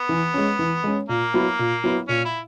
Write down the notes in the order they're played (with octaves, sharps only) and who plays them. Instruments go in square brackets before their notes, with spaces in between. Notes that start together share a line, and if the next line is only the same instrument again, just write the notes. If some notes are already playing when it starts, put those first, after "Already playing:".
Already playing: [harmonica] B3
[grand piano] E3
G#3 C#4
E3
G#3 C#4
[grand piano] A#2 [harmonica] A#3
[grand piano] F#3 B3 E4
A#2
F#3 B3 E4
[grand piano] A#2 [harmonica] C#4
[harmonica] E4